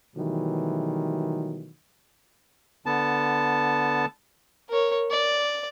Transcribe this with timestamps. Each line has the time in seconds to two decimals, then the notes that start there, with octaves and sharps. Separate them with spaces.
0.16 B2 D#3 E3 F#3 G3 A3
2.86 D3 B3 A5
4.69 A#4 C#5
5.11 D5